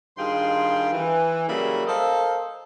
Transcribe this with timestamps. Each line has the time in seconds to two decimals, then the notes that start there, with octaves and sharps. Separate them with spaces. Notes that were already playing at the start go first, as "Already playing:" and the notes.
0.17 G2 D#3 F4 G#4 G5 C6
0.93 E3
1.48 C#3 F#3 G3 A#3 E5 B5
1.87 A4 A#4 C5 D#5 F5